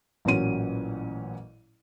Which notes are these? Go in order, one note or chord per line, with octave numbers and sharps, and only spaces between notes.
A1 A#2 F#3 C#4 D#7